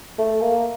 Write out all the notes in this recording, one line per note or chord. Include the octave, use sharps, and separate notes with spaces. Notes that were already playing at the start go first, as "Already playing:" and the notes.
A3
A#3